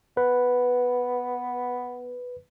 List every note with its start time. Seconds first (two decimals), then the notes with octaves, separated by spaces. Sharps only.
0.17 B3 B4